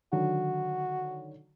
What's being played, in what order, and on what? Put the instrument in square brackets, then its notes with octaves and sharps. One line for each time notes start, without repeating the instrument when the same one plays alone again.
[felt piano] D3 D#3 F#3 [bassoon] F#4